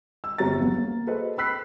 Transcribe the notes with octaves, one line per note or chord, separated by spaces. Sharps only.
E6
G1 G3 C4 C#5 A#5 A6
E2 C#3 F#3 B3
A#3
F#4 G#4 A4 B4 C5 D#5
B5 E6 F#6 B6 C7